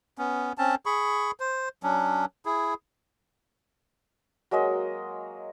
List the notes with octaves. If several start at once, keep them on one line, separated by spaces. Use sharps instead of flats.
B3 C#4
C4 C#4 A5
G#4 B5 C#6
C5
F#3 C#4 D4
E4 G#4
F#3 G#3 A#3 D#5